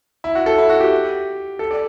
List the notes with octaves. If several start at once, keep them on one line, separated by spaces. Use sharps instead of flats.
E4
F#4
A4
E4
F#4
G4
A4
D5